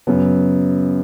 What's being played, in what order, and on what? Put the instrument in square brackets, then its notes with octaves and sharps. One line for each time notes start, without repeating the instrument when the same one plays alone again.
[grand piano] F#2 C#3 F#3 B3